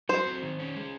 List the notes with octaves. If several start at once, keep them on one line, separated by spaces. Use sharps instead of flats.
F#3 C5
C4
D#3
C#4
G#3